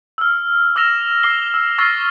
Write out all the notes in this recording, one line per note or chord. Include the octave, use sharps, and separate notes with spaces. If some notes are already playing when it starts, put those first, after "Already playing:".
E6 F6
D6 E6 F6 A#6 E7 F7
D6 C7 G7
E6
C#6 E6 F6 A6 A#6 C7